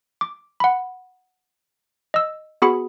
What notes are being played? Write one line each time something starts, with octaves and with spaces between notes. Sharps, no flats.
D6
F#5 B5
D#5 E6
B3 F#4 G#4 B5 C#7